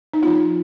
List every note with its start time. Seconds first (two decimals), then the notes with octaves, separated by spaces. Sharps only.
0.14 D#4
0.22 F3 B3 F4